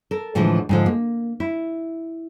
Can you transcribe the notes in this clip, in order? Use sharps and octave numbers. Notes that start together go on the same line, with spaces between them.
A4 A#4
A2 D3 E3 F3 G#3
G#2 D3 F3
A#3
E4